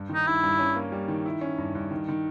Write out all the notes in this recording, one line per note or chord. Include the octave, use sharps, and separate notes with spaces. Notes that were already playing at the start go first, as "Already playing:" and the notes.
Already playing: G2
D#3
D#4
G2 E4
G2
C#4
A#3
G3
D#3
E4
C#4
G2
G2
D#3
D#3